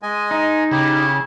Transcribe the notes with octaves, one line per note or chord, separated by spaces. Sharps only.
G#3 D#5 G#5
D#4
C#3 E4 G4